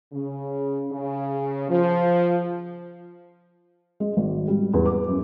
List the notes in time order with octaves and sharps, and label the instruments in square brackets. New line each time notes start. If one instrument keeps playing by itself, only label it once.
[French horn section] C#3
C#3
F3
[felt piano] G#3
G#1
G3
E2
D6
F#2